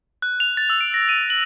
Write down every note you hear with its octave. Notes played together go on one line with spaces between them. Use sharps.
F#6
F7
A6
E6
D7
A#6
D#7
F#7